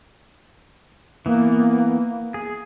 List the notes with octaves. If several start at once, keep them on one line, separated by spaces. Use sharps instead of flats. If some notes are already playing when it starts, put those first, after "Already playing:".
E3 A#3 B3
G#4